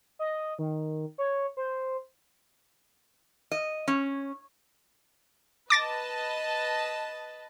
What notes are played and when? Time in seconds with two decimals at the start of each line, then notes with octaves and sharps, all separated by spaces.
0.19 D#5
0.59 D#3
1.18 C#5
1.57 C5
3.52 D#5
3.88 C#4
5.70 B4 D#5 A5 D6 A6 A#6